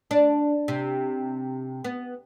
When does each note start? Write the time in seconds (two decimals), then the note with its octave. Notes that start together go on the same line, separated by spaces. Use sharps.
0.11 D4
0.68 C3
1.84 B3